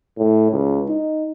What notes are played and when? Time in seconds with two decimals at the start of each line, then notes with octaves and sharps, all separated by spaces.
0.18 A2
0.52 C#2
0.88 D#4